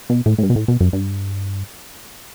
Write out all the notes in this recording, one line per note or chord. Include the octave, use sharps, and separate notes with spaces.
B2
A2
A2
G2
B2
A2
B2
F#2
G2